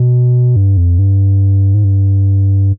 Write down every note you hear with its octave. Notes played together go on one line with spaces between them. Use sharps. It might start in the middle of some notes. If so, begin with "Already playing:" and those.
Already playing: B2
G2
F2
G2
G#2
G2